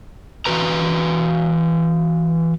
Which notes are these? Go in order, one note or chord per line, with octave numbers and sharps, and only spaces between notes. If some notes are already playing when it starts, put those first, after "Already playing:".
E3 F#4 B4 A#5